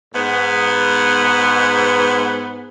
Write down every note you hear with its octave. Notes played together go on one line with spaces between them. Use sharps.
G#2 B3